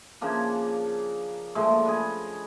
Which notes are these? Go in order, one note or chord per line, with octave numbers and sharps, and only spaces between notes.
C#3 F3 A#3 D4
A#2 F3 G#3 A3
G#4 B4